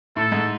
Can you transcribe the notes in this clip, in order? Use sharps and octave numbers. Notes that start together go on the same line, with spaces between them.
A2 A3 A4
G#2 G#3